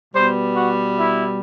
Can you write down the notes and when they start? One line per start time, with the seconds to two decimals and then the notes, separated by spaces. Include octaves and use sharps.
0.13 B2 G3 B3 C5
0.55 F#4
0.97 E4